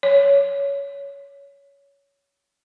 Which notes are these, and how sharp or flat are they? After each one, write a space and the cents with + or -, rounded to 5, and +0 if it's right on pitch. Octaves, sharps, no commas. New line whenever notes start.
C#5 +15